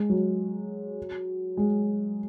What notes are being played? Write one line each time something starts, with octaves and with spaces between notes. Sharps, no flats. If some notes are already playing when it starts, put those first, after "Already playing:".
Already playing: G#3
F#3
G#3